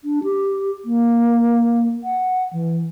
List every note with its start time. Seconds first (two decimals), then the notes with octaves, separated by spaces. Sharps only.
0.04 D4
0.23 G4
0.85 A#3
2.04 F#5
2.53 E3